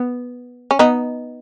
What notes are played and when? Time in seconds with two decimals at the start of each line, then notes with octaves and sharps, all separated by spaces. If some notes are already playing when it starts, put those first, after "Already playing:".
Already playing: B3
0.71 C#4
0.79 B3 D#4